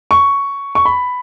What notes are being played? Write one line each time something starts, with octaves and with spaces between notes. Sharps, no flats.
C#6
C#6
B5